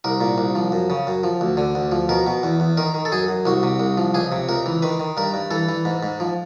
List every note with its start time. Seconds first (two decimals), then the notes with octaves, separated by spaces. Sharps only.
0.04 C2 A#4
0.21 A#2
0.38 C2
0.55 F3
0.72 F#2
0.90 C#3
1.07 F#2
1.24 F3
1.41 D2
1.57 D3
1.75 D2
1.92 F3
2.09 B2 A#4
2.27 B2
2.43 E2
2.60 E2
2.77 D#3 A#4
2.94 D#3
3.05 A4
3.12 F#2 G#4
3.28 F#2
3.45 C2 F#4
3.63 C3
3.80 C2
3.98 F3
4.14 C#2 G#4
4.32 C3
4.49 C#2 A#4
4.66 E3
4.82 D#3 B4
5.00 D#3
5.17 G2 A#4
5.34 G2
5.51 E3 A4
5.69 E3
5.85 G#2
6.03 G#2
6.20 F3